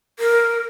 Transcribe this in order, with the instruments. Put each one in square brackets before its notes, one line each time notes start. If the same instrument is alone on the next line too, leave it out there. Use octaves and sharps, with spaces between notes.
[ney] A#4